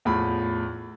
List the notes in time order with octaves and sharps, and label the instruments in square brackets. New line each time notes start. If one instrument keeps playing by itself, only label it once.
[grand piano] E2 A2 F3 B5